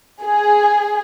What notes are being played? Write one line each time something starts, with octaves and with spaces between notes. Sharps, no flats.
G#4